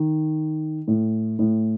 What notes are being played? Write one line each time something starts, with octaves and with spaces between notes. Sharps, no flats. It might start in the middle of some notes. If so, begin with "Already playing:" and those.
Already playing: D#3
A2
A2